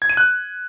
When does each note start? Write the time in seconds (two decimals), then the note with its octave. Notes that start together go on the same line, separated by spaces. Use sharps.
0.02 G#6
0.10 D#7
0.17 F#6